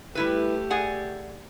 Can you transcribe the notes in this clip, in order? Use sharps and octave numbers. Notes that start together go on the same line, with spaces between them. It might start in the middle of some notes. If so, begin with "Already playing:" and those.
G3 A3 E4 G4 B4
G#4 D5 F#5